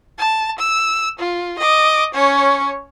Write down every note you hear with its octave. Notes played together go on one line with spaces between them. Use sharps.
A5
E6
F4
D#5 D6
C#4 C#5